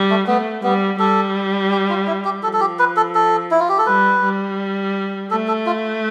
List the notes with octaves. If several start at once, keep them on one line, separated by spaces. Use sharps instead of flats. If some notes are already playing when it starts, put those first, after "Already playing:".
Already playing: G3
A3
A3 B3
G3 B3
G3 A4
G4
F4
E4
G4
F3 A4
A4
G4
B4
A4
A4
E4
F4
G4
A4
G3 B4
G3
A3 A4
A4
F4